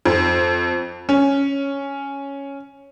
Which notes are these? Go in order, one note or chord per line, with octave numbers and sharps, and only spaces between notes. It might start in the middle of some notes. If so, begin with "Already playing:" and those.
F2
C#4